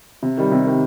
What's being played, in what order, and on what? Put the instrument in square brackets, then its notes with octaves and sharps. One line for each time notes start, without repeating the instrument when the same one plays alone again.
[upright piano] C3
D#3 G3
C3
D#3 G3